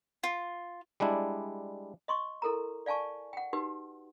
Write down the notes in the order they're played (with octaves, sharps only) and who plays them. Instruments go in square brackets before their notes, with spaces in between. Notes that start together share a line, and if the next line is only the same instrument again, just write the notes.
[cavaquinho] F4
[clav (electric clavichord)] G3 G#3 D4 E4
[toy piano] D#5 C6 C#6
E4 A4 A#4 A#5
D5 F5 G#5 A5 C#6
F#5 G5
D#4 F#4 G4 B4